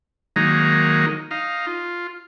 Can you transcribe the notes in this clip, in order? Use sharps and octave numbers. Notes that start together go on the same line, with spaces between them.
D#3 F#3 G#3 A#3 D#4
D#4 F5
F4